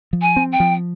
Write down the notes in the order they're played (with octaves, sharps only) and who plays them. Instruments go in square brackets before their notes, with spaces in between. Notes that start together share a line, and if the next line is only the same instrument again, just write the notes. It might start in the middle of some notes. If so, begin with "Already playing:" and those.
[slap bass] F3
[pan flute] G#5
[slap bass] C4
[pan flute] G5
[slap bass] F3